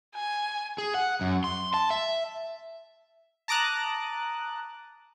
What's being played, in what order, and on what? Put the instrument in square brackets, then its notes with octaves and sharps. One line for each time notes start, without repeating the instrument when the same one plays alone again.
[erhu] G#5
[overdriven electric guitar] G#4
F#5
F#2
C6
A5
E5
[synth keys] A5 A#5 D6 D#6 F#6